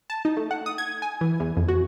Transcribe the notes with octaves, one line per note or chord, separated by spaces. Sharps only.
A5
D#4
A3
F#5
D#6
G#6
G#5
E3
E2
F2
F#4